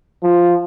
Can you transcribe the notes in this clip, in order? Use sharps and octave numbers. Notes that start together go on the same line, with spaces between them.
F3